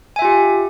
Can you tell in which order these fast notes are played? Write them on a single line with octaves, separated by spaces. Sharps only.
G#5 E5 F4 G4